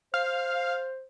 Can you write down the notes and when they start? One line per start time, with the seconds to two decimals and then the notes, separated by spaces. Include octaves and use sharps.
0.14 C5 F5